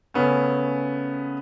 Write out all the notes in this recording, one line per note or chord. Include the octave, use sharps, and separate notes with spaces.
C#3 A3 B3 C#4